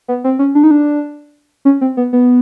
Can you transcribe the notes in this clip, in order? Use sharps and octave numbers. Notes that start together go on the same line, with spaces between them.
B3
C4
C#4
D4
D#4
D4
C#4
C4
B3
B3